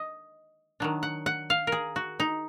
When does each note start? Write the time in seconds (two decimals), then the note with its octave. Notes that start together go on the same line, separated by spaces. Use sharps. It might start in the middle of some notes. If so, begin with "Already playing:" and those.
Already playing: D#5
0.80 D#3 F#3 D4
1.03 F#5
1.26 F#5
1.50 F5
1.67 A#4
1.72 G#4
1.96 F#4
2.20 D#4